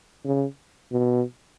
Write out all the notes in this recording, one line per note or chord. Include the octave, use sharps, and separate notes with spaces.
C#3
B2